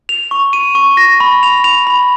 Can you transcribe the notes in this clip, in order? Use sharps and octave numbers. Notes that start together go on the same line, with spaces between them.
F7
C#6
D#7
C#6
A#6
B5
F7
F7
B5